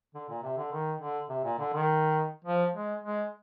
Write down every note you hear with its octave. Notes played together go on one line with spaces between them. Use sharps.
D3
A#2
C3
D3
D#3
D3
C3
A#2
D3
D#3
F3
G#3
G#3